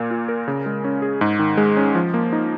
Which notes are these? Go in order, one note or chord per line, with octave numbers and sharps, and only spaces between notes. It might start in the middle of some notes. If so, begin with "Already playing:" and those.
Already playing: A#2 A#3
F4
A#4
C#3
G#3
C#4
G#4
G#2
D#3
G#3
C#4
F3
A#3
D#4